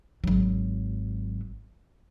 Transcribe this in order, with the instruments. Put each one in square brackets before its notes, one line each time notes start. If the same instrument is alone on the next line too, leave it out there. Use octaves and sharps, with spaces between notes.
[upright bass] G#1 F#3